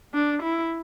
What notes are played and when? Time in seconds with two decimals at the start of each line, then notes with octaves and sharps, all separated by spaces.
0.14 D4
0.42 E4